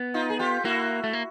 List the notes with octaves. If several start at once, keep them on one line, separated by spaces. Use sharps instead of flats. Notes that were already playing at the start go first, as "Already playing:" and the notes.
Already playing: B3
D#4 F4
G#4
F4 G4
A#3 E4 F#4
A3
A#3